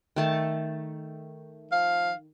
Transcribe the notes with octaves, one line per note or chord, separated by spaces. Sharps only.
D#3 A3 A5
F3 F5